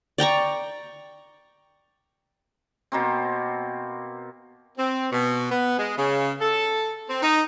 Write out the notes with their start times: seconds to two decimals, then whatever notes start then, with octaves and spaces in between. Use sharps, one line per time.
0.18 D5 G5 A#5 C#6
2.92 B2 A#3 C4
4.78 C4
5.12 B2
5.51 B3
5.78 G#3
5.97 C#3
6.40 A4
7.09 C4
7.22 D#4